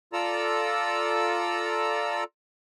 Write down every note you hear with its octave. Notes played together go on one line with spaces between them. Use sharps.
F4 A4 D5 A#5 E6